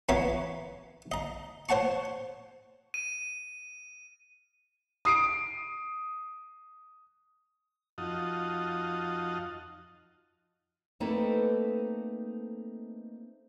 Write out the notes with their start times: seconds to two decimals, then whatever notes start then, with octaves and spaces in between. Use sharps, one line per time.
0.09 E3 A#3 B3 E4 C#5 A#5
1.12 D#5 A#5
1.69 C5 C#5 F#5 A5 C#6
2.94 D#7
5.05 D#6 C7 D7
7.98 F2 D#4 F4 F#4 D#5 A5
11.00 A3 A#3 C4 D#4 A4 B4